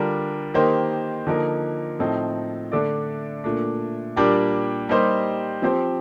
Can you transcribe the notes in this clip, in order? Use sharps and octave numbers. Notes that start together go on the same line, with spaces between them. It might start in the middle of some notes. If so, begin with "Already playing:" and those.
Already playing: D3 G3 D4 F4 A#4
D#3 A#3 D#4 G4 C5
D3 F3 A#3 D#4 A#4
A2 F3 C4 D#4 A4
D3 A3 D4 A4 D5
A#2 A3 D4
A#2 G3 A#3 D4 G4
G3 A#3 D#4 G4 C5
F3 C4 G4 C5